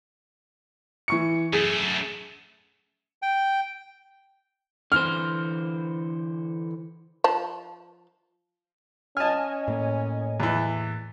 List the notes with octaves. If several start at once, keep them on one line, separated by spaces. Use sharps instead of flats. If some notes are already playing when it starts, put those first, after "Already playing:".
E3 C#6 C#7
F#2 A3 G#4
G5
D3 E3 C5 F6
F3 A5
C#4 D#5 G#5 A5 F6
A2 A#3
E2 E3